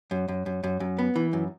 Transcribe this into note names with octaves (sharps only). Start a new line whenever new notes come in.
F#2
F#2
F#2
F#2
F#2
B3
E3
F#2